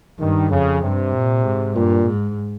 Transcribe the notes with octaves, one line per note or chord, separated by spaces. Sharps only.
G2 D#3
F2 C#3
G2 C3
A#2
G#2
G2 A#2
G#2